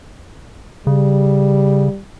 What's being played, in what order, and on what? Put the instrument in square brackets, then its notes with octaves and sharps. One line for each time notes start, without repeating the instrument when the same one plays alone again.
[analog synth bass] C#3 [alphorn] G3